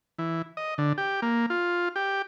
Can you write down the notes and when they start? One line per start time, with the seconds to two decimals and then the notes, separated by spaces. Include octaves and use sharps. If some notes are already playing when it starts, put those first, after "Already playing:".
0.19 E3
0.57 D#5
0.78 D3
0.98 G4
1.22 A#3
1.50 F4
1.96 G4